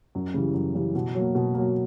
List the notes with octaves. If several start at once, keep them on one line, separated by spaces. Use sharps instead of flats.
F#2
C#3 E3 G3
F#2
C#3 E3 G3
B2
F#3 A#3
B2
F#3 A#3